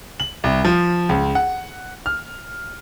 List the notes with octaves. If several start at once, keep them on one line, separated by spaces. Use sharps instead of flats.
F#7
C2
F3
C#2
F#5
F6